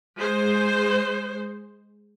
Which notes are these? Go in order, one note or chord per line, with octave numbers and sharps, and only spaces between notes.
G#3 C5